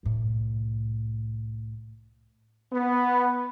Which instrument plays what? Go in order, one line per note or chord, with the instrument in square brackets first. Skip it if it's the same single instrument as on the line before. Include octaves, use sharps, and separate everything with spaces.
[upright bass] C2 A2
[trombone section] B3